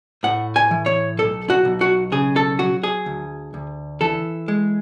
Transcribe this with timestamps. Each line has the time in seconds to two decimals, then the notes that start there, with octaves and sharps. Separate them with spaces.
0.23 A2 F#5
0.56 G#5
0.71 E3
0.86 C#5
1.19 B1 A4
1.50 F#4
1.65 B1
1.81 F#4
2.12 C#3 G#4
2.36 A4
2.59 F#3 F#4
2.83 G#4
3.06 D2
3.54 D2
4.01 E3 A4
4.48 G#3